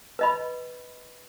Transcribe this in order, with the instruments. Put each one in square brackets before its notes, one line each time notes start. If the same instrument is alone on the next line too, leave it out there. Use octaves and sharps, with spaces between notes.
[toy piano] B4 D#5 B5